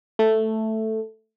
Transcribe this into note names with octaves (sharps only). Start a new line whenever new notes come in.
A3